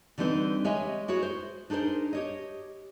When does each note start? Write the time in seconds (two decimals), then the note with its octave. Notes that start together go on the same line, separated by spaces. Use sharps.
0.18 D3 E3 G3 C4 D#4 B4
0.64 G#3 G4 C#5 D#5 E5 G#5
1.08 E4 F#4 G#4 C#5
1.23 C5
1.70 D4 D#4 G#4 A#4 C5
2.13 G4 C#5 D#5